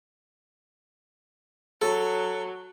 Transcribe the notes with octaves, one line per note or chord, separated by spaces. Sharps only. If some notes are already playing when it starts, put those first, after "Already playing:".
F#3 A4